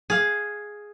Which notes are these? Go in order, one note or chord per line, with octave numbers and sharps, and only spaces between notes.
G#4 F5